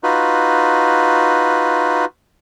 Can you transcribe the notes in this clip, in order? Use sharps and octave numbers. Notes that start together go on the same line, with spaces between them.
D#4 F4 F#4 B4